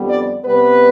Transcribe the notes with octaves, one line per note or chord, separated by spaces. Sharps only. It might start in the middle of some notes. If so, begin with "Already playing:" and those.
Already playing: F2 D3 G3 B3
D5
C3 G3 B3 B4